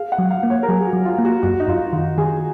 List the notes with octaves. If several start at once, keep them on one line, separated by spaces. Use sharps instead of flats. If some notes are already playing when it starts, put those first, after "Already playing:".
Already playing: G#4 F5
F#5
F#3
F5
A#3
C#5
A#4
F#3 G#4
G#4
F#4
F#3
F4
A#3
F#4
F#2 F#4
D#4
F#2 F4
D#3 F4
D#3 G#4